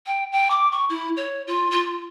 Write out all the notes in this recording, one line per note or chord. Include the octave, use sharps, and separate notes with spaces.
G5
G5
D6
C#6
E4
C#5
F4
F4